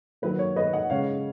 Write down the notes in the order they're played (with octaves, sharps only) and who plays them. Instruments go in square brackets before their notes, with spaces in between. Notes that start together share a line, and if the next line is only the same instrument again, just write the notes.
[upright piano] D#3 F#3 A#3 B4
C#5
B4 D#5
D#5 F#5
C#3 G#3 C#4 C#5 F5